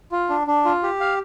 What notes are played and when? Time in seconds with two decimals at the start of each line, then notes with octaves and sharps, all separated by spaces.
0.12 F4
0.29 D4
0.47 D4
0.65 F4
0.83 G4
1.00 F5